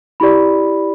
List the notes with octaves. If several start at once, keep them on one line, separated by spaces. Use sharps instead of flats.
E4 G4 D5 B5